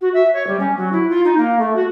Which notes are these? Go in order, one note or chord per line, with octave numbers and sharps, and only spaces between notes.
F#4
E5
C#5
G3
C#4
F#3
E4
F4
D#4
A#3
A3
F#4